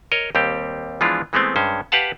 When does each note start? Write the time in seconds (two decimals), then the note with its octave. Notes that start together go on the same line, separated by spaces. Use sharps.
0.12 A#4 C#5 D#5
0.35 D#2 G3 C4 G4
1.01 E3 F3 G#3 B3 D4 F4
1.33 E3 G#3 A3 B3 C4
1.56 G2 G#3 C#4 C5
1.92 G4 B4 F5 F#5 A5